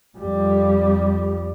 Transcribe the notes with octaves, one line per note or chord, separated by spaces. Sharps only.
F2 G3